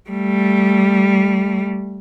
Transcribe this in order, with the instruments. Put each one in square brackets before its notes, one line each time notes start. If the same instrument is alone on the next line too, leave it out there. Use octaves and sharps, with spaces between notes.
[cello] G3 A3